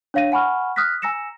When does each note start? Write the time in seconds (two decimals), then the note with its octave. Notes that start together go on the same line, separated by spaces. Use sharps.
0.14 D4 C#5 F5 A#6 D#7
0.32 F#5 G#5 B5 C#6 F6
0.76 D#6 F6 F#6 A#6 B6
1.02 G#5 A#5 E6 A#6 C#7 E7